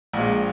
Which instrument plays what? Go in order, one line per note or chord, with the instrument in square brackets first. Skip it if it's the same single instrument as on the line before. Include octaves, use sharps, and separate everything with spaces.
[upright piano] A#1 A#2 G#3